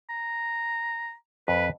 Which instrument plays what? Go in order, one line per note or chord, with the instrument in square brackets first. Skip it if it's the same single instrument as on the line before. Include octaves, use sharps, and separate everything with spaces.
[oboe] A#5
[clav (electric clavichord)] F2 [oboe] B4